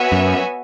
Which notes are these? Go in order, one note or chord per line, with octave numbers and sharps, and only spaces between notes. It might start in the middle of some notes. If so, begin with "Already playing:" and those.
Already playing: B3 F#4 C#5 E5 G#5
F#2